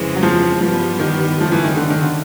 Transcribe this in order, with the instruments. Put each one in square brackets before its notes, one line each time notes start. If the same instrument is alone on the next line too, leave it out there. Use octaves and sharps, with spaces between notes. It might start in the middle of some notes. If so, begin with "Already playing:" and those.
Already playing: [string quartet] F2 C#3 E3 G#3 C4
[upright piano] F#3
F3
[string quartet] G2 E3 G3 B3 [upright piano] F3
[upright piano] D#3
[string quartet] F#2 C#3 F#3 A3 [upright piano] F3
[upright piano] E3
D#3
D3
D#3
D3